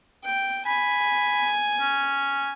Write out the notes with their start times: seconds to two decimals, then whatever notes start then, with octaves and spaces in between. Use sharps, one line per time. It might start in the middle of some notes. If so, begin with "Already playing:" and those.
0.25 G5
0.66 G#5 B5
1.80 C#4